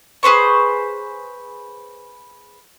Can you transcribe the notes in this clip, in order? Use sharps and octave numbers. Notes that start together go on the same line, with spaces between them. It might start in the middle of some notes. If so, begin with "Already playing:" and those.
G#4 B4 C5 C#6